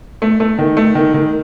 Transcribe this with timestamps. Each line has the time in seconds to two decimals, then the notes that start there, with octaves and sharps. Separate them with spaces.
0.22 A3
0.40 A3
0.58 D#3
0.77 A3
0.95 D#3
1.14 D#3